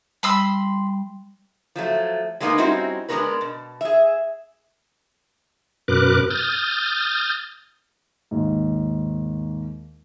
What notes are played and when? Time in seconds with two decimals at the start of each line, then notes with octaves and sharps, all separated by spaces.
0.23 G3 B5 C6 E6
1.76 F3 F#3 A3
2.40 F#3 G#3 A#3 B3 D#4 B4
2.58 G3 C4 C#4 D#4 E4 F#4
3.09 G#3 B3 D4 F#4 A#4 B4
3.41 B2
3.81 G#4 E5
5.88 F#2 B2 A#4 B4 D6 F#6
6.30 D#6 F6 G6 A6
8.31 D#2 G#2